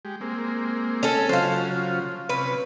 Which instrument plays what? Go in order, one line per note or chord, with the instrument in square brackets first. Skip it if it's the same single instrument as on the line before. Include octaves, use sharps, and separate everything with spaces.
[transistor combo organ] G#3 G4
G#3 A#3 C4
[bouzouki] C#4 A4
[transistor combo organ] C#3 F#3 F4 [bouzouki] C5 F5
[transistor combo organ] C3 C#4 [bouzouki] B4